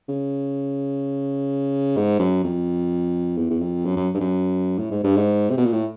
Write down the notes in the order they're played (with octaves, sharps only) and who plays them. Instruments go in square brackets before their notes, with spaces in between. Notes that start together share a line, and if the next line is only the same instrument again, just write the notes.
[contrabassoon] C#3
G#2
F#2
F2
E2
E2
F2
F#2
F#2
G2
F#2
A2
G#2
G2
G#2
C3
B2
A#2
A2